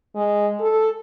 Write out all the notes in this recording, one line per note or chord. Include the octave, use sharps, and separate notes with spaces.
G#3
A4